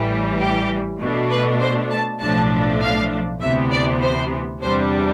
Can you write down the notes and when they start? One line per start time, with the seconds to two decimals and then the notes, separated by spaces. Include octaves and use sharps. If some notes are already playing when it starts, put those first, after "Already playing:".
Already playing: A1 A2 E3 G3
0.40 G4
1.00 B2 A3 D4
1.31 B4
1.61 C5
1.90 A5
2.21 B1 A2 F3 A3 D4 A5
2.82 F5
3.41 D2 C3 E3 B3 E5
3.72 D5
4.02 C5
4.62 E2 C3 G3 D4 C5